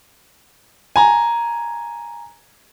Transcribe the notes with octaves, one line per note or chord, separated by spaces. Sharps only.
G#5 A#5